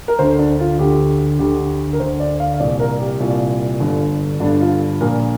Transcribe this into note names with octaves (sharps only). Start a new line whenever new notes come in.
A#4
D2 D3 C5
D4
F4
D2 D3 G4
D2 D3 G4
A#4
D2 D3 C5
D5
F5
F5
C2 A#2 D5
A#4
G4
C2 A#2 F4
G1 G2 D3
G1 G2 D3 D4
F4
A#1 A#2 A#4